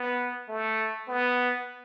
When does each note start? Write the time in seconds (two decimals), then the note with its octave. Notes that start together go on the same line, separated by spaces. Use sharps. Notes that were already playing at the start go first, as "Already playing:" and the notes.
Already playing: B3
0.49 A3
1.08 B3